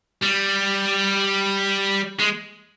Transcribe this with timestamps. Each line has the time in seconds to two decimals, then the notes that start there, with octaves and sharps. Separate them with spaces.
0.22 G3
2.20 G#3